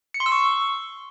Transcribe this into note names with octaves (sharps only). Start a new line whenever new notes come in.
C#7
C6
E6
C#6